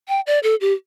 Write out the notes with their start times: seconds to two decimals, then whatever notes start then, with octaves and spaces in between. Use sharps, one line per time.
0.08 G5
0.27 D5
0.43 A4
0.61 G4